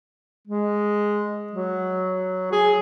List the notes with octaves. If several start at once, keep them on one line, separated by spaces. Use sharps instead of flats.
G#3
F#3
G#4